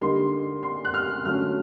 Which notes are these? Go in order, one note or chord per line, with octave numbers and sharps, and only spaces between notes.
D3 G3 A#3 D#4 C6
C6
F#6
F6
D3 F#3 A3 C#4 F6